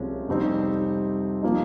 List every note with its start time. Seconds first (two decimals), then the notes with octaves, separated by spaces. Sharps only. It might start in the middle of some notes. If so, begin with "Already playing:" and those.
Already playing: C2 C3 F3 G#3 C#4
0.28 F2 C3 G3 C4 D#4
1.43 F3 A#3 D#4